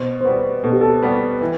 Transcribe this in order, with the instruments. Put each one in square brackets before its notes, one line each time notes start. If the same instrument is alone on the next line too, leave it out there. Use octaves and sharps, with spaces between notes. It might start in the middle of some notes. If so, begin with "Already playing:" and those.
Already playing: [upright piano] B2 [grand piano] C5
[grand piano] C5
[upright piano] G3 B3 F#4 [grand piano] B4
[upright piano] B2 [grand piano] A4
[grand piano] G4
A4
[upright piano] G3 B3 F#4 [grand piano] B4
[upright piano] E3 [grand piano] B4